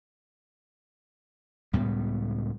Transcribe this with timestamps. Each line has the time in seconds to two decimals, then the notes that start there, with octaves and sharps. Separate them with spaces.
1.73 C#2 A2 G3 B3